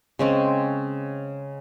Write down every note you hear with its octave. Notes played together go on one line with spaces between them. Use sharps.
C#3 G#3 C4 C#4